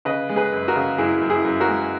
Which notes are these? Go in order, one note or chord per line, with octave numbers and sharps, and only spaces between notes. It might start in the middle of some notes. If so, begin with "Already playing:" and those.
C#3 B4 D#5
G#3
G#4 B4
F#2
F#4 A#4
C#3
F#2 E4 G#4
F#2
E4 G#4
F#2
F#4 A#4
G#3